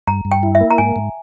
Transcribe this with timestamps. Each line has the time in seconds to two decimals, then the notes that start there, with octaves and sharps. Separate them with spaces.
0.07 G2 A#5
0.25 G2
0.31 G5
0.43 E4
0.55 E5
0.61 A#3
0.71 A#5
0.78 G#2 G#5
0.96 G#2